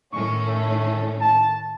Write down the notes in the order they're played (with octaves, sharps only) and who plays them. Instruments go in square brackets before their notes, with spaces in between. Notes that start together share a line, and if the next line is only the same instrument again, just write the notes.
[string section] A2 D#3 C#4 [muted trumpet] C#6
[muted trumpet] A3
A5